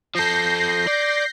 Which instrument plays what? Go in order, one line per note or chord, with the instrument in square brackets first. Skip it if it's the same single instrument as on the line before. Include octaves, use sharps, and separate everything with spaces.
[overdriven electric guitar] F3 A4 [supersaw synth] G6 A#6 C7
[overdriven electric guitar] D5